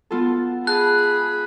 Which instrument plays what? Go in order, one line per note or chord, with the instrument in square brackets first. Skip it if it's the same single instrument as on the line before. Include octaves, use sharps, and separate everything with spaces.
[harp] B3 F4 A4
[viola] G#4 B5 [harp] A5 [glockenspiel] F#6